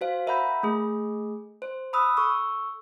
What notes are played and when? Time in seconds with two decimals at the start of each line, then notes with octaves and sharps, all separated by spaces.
0.01 F#4 C5 F5
0.27 A#4 E5 F#5 A#5 B5 G6
0.63 A3 G#4
1.62 C5
1.93 B5 D#6 E6 F#6
2.17 A4 C#6 E6